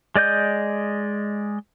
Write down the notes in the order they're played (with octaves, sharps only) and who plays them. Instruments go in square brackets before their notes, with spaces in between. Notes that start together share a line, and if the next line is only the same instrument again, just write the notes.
[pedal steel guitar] G#3 D5 D#5 G6